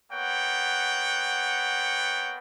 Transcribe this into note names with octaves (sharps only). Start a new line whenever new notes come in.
A#3 B3 C#5 F#5 G5